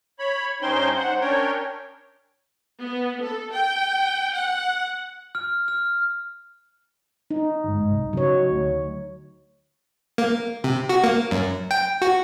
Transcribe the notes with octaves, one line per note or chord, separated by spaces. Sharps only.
C#5 B5
G2 C#4 D#4 C5 G5 C6
G#2 C5 F#5
C#4 D4 A#4 C#5 G5
B3
A4
G5
F#5
F6
F6
D#4
G1 G#2
C2
C#3 F#3 C#5
D2
A#3
C3
F#4
A#3
F#2
G5
F#4